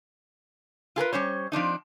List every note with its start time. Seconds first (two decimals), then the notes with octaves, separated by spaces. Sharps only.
0.96 F4 G#4 A#4 B4
1.13 G3 C#4 C5 C#5
1.52 F3 C4 D4 D#4